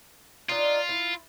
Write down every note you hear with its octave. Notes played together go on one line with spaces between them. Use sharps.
D4 D#4 F4
E4